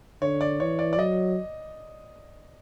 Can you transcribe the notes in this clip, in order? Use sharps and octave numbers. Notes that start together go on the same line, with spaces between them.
D3 C#5
D5
E3 C#5
D5
D5
F#3 D#5